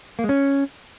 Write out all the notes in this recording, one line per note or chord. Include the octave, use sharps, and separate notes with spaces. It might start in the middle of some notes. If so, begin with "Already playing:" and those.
A#3
G#3
C#4